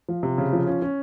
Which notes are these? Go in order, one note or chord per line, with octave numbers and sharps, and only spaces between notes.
F3
C3
C#3
F3
C#4
C#4